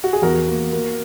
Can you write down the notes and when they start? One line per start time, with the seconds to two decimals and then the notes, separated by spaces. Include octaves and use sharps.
0.04 F#4
0.13 G#4
0.22 E2 F#4 A#4
0.48 A#3
0.73 A#3